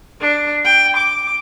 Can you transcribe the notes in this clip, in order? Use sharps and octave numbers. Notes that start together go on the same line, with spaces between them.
D4
G5
D6